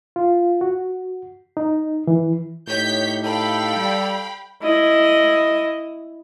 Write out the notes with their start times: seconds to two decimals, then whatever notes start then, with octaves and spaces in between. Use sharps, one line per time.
0.16 F4
0.61 F#4
1.57 D#4
2.07 E3
2.68 A2 D#4 G4 C#5 G6 B6
3.24 A4 F5 G5 B5
3.76 G3
4.62 E4 D#5